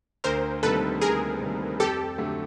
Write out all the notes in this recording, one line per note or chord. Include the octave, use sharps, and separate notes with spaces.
D2 A#4 C5
C3 D#3 G3 A#3 A4 B4
D2 G#4 A#4
C3 D#3 G3 A#3
F2 G4 A4
D3 F#3 A3